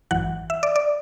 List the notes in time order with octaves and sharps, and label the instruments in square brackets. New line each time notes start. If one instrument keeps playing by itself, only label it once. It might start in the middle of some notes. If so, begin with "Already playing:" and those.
[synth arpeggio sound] G#1 F#2 E3 F#5
E5
D5
D5